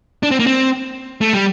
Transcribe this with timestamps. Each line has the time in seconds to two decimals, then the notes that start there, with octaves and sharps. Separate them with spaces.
0.23 D4
0.31 C4
0.40 A#3
0.47 C4
1.21 A3
1.33 G3